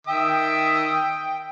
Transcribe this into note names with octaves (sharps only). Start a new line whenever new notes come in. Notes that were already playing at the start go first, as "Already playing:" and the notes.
D#3 E5 G5 D#6